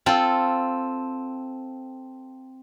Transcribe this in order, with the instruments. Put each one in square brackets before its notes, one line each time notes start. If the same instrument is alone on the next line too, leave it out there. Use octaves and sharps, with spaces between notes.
[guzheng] C4 F4 A4